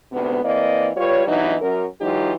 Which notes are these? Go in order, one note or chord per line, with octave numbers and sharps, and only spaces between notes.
D2 G#2 C3 B3
E3 A#3 C4 D5 D#5
G3 F4 B4 C#5
G2 E3 F#3 B3 D#4
F#2 A#4
E3 F#3 G#3 D#4 F4 G4